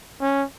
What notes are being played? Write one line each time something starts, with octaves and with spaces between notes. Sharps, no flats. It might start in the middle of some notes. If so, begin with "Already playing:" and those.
C#4